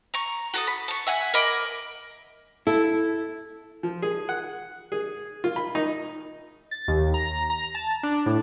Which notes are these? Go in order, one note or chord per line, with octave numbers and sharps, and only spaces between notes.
A#5 C#6
F#4 A4 A5 D#6
B5
A5 C#6
E5 F#5 G#5
A#4 D#5 B5 D6
E4 A4
F3
G#4
F#5
G#4
F4
B5
D#4
A6
D#2
A#5
A#5
A5
D4
A2